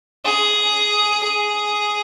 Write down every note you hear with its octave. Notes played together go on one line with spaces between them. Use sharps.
G#4
G#4